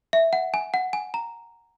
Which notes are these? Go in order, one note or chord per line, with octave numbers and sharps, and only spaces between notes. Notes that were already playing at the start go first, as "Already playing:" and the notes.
E5
F#5
G#5
F#5
G#5
A#5